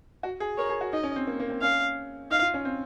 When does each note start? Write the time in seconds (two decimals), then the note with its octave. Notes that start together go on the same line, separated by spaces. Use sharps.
0.23 F#4
0.40 G#4
0.57 A#4 C#5
0.69 G#4
0.81 F#4
0.93 D#4 D#5
1.03 C#4
1.16 C4
1.27 A#3
1.40 A#3
1.50 C4
1.62 C#4 F5
2.30 D#4 F5
2.42 F4
2.54 C#4
2.65 C4